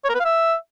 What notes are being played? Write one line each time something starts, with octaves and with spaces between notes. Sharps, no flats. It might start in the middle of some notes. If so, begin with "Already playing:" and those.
C#5
A#4
B4
F5
E5